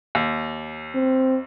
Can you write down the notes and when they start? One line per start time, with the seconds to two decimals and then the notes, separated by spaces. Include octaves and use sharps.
0.15 D#2
0.95 C4